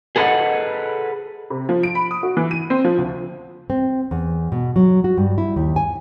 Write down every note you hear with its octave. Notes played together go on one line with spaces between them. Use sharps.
G#4 A4 B4 C5 D#5 F#5
C3
F3
D7
B5
D#6
F#4
E3
D#7
C4
F3
D2
C4
E2
B2
F#3
F#4
G2
E4
D#2
G#5